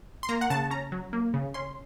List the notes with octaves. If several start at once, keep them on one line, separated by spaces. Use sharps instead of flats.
C6
A#3 A#5
F#5
C#3 A5
C#4 A#5
F#3
A#3
C#3
C#4 C6